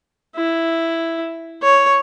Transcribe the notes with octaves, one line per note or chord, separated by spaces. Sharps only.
E4
C#5